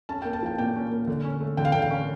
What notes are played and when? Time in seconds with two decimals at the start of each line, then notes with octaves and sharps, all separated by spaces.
0.09 C#4 A5
0.22 G5
0.25 A#3
0.33 A5
0.42 F3 G5
0.58 A#2 G5
0.76 C#4
0.91 A#3
1.07 D3
1.24 C#4
1.40 A3
1.57 D3 G5
1.65 F5
1.72 D3 G5
1.82 F5
1.90 C#4